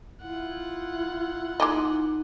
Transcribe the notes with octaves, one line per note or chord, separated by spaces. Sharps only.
E4 F4 F#5
G#3 A#3 D#4 D#5